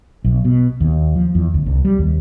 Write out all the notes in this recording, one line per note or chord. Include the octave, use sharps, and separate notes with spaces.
B1
B2
D#2
F3
E2
D2
C2
G3
D#2